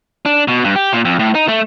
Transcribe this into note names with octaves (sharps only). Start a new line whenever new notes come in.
D4
B2
G2
G4
A#2
F2
A2
D#4
A3